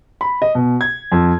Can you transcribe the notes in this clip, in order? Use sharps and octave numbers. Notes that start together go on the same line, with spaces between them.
B5
D#5
B2
G#6
F2